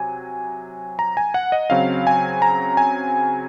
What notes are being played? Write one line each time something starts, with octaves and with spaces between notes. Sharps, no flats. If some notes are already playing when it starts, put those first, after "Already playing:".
Already playing: C3 F#3 G#5
A#5
G#5
F#5
D#5
C#3 F#3 C4 F5
G#5
A#5
G#5